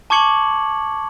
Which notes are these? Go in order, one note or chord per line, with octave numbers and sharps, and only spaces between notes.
A5 C#6 D6 G#6 C#7 F#7